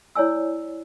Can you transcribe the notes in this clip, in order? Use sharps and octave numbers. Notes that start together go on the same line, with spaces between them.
E4 C#5 D5 G#5 E6